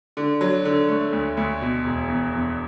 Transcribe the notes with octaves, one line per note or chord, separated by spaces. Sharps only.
D3
F#3
D3
A3
D2
D2
B2
E1
E2
E2